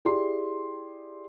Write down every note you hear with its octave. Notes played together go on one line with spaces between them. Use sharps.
E4 G4 G#4 D5 C6